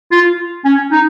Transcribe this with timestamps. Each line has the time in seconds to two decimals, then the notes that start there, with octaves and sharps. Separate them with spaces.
0.12 F4
0.65 C#4
0.92 D#4